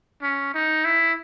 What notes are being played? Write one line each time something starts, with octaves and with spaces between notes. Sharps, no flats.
C#4
D#4
E4